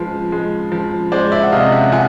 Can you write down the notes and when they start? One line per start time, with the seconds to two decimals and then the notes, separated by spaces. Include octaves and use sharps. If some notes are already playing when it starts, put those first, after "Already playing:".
Already playing: F3 G#3 B4
0.32 G#3
0.72 F3
1.12 G#3 C5 D5
1.32 D5 E5
1.43 F#5
1.52 C3 D#5 F5
1.72 E5 F#5
1.92 F3 F#5 G#5